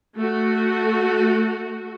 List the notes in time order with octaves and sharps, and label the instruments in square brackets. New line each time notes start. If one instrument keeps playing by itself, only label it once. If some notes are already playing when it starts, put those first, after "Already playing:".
[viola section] A3 F#4